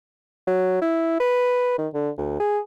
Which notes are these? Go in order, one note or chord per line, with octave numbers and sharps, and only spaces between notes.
F#3
E4
B4
D#3
D3
D2
G#4